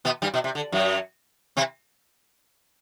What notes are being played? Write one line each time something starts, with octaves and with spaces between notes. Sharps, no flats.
B2 B3
G2 G3
B2
C3
D3
F#2 F#3
C3 C4